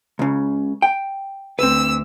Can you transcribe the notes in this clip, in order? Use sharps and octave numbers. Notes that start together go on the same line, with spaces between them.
C#2 C#3
G5
D2 C4 B4 E6